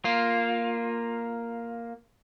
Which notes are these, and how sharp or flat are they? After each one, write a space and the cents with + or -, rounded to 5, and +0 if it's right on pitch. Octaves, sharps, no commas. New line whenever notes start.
A#3 +0 F4 +0